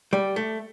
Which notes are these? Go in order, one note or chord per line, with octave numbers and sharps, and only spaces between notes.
G3
A3